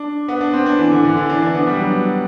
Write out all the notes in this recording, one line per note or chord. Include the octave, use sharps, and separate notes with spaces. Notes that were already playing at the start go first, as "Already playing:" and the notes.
Already playing: D4
B3
D4
C4
D4
E3
D3
D3
E3
D4
D4
B3
G3
F#3